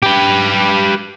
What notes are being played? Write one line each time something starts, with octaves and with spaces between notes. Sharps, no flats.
G4 B4